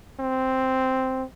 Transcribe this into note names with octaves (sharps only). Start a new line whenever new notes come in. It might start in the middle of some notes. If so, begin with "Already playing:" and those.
C4